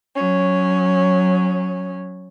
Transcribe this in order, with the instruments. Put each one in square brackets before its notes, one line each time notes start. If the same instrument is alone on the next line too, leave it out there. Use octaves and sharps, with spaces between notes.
[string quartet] F#3 C#4